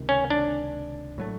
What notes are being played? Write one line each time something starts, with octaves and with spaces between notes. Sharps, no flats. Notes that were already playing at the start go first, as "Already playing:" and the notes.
Already playing: C#2 C3 D#3
C#4
D4
A2 F#3 A3